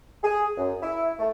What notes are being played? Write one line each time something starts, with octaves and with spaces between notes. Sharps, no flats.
G#4
F#2
E4
A3